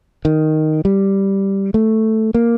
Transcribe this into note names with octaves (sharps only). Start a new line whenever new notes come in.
D#3
G3
A3
A#3